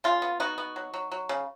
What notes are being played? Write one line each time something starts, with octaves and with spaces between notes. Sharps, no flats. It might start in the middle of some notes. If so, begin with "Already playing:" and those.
C#3 F4
B3
B3 D#4 F#4
B3
F#3
F#3
F#3
C#3